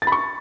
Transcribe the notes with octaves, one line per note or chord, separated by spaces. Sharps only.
A6
B5
C#6